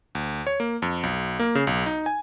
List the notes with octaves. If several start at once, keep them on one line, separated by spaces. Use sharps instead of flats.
D2
C#5
A#3
F2
B1
A#3
C#3
B1
D#4
G#5